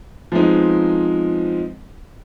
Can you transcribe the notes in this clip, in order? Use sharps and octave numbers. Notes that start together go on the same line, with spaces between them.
F3 G#3 B3 C4 D#4